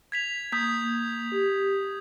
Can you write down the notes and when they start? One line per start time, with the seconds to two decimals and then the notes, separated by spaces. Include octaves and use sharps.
0.12 G#6 B6 F7
0.52 A#3 D#6 G6 B6
1.32 G4